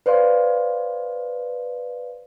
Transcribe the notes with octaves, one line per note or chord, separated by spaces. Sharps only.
B4 C5 D5 F5 C6